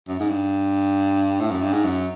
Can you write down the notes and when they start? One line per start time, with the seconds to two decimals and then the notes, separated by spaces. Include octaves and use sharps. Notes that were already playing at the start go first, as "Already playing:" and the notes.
0.08 F#2
0.20 G#2
0.30 G2
1.40 A2
1.51 F#2
1.62 G2
1.73 G#2
1.84 F#2